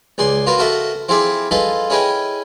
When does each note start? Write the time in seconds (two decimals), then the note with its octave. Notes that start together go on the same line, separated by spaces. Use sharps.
0.18 C#2 G#4 D5 C6
0.46 F4 F#4 A#4 B4
0.59 F#4 A4 A#4 D#5 E5 F#5
1.09 C4 E4 F4 G#4 D5 E5
1.51 F4 G#4 A4 B4 D#5
1.90 C#4 E4 G#4 B4 D#5 G5